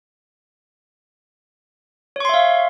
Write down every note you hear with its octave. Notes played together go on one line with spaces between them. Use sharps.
C#5 E5 F5 C6 C#6